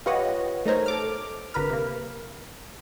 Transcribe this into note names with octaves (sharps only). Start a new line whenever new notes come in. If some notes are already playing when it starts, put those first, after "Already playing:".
F4 G4 B4 C#5 D#5 F#5
A3 D#4 A#4 C5 C#5
A4 D6 F6
G#1 D3 A#4 B4 B5 F6
C3 A#3